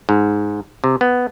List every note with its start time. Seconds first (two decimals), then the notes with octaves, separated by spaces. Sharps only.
0.09 G#2
0.84 C3
1.01 B3